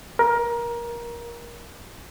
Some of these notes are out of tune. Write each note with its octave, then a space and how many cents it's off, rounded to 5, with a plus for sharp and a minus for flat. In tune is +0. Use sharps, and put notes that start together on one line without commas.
A#4 +20